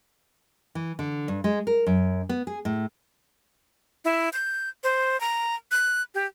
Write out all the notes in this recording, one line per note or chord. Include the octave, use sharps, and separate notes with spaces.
E3
D3
G2
G#3
A#4
F#2
B3
G#4
A2
E4
G6
C5
A#5
F#6
G4